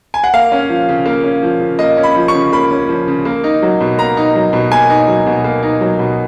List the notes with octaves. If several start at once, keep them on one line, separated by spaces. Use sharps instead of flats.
G#5
F#5
A#3 F5
C#4
F3
C#3
A#3
C#4
F3
C#3
A#3 D#5
C#4
B5
F3
C#6
C#3
A#3 B5
C#4
F3
C#3
A#3
D#4
F#3
B2
A#3 A#5
D#4
F#3
B2
A#3 G#5
D#4
F#3
B2
A#3
D#4
F#3
B2